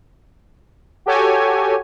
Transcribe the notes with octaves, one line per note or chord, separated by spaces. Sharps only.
F#4 G4 A4 C#5 G#5